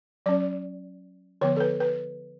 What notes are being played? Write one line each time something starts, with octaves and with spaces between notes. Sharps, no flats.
F#3 C#4 D5
D3 F3 B3 C#5
A4
B4
B4